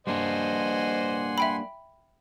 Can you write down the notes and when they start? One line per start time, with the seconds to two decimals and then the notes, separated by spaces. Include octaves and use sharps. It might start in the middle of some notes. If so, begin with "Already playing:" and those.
0.07 G3 A#3 D4 C5 D#5 F#5 G#5 C6
1.38 E5 G5 B5